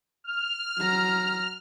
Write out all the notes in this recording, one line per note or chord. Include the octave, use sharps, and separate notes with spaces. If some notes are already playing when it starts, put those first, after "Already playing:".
F6
F#3 A#5